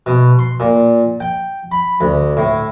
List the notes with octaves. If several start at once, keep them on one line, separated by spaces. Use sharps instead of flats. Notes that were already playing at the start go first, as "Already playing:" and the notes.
B2
C6
A#2
G5
B5
D2
A2